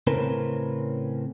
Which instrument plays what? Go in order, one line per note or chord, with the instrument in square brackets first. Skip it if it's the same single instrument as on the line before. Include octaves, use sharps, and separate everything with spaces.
[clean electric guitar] A2 C#3 C4 C#4 A#4 B4